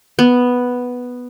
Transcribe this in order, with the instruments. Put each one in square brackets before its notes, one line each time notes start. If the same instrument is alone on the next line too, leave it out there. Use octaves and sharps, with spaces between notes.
[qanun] B3